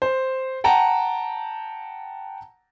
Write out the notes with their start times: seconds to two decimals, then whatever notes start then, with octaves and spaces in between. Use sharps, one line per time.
0.02 C5
0.64 F#5 G5 A5 A#5